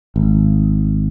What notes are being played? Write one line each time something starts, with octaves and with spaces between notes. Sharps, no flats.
G#1